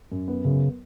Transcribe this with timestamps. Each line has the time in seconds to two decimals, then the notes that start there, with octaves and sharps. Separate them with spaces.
0.12 F#2
0.28 B3
0.45 F#2 C#3